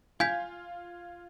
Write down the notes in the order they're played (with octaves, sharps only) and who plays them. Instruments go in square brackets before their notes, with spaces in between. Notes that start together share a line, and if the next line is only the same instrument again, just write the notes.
[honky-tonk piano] F4 [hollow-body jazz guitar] F5 [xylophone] G#5 G6 B6 [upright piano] G#6